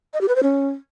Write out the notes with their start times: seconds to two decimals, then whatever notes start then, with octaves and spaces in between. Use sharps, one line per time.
0.14 D#5
0.21 G4
0.28 B4
0.36 C5
0.43 C#4